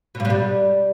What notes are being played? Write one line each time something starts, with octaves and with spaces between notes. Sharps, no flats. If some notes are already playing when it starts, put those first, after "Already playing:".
B2
G2
B2
G3